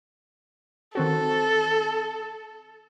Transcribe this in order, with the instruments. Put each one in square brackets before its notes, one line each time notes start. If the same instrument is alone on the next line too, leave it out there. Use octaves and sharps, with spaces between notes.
[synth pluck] D#3 C4 F#4 [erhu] A4